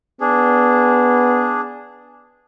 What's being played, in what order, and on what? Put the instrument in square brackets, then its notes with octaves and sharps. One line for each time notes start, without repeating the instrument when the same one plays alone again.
[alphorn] B3 [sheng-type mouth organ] D4 G#4